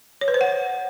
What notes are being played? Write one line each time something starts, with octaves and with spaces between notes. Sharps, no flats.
C#5
B4
C5
F#5